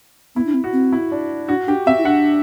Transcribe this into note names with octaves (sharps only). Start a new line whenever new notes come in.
B3 E4
D4
C4
F#4
C4
E4
D4
D4 F#4
D4 G4
C4 E5
E4
D4 F#5